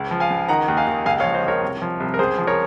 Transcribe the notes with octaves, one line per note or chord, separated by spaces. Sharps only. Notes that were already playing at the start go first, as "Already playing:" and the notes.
Already playing: C#2
F3
F5 G#5
C#2
D#3 F#5 A#5
D#2
F5 G#5
D#2
C#2 F5 G#5
C#5 F5
F3
C5 D#5
C#2 A#4 C#5
C2
F3
C2
A#4
C#2 G#4 C5
F3
A#4 C#5